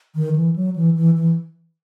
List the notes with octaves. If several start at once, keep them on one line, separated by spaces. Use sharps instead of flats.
D#3
E3
F#3
E3
E3
E3